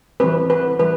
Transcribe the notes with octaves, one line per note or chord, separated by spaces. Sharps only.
E3 G3 C4 B4
B4
E3 G3 B4